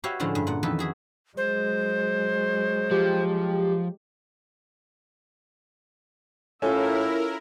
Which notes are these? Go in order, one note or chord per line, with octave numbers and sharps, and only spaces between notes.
F#4 G4 B4 C#5 E5 F5
A2 D3 F3 G#3 C#4 E4
G2
A#2 F#5
F2 D#3 E3 A4 B4
F#4 G#4 E5
F#3 G#3 C5
F3 G4
A2 C#4 E4 F4 A4 A#4